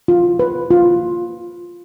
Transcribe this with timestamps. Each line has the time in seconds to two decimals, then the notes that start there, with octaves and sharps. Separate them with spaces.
0.08 F4
0.39 B4
0.71 F4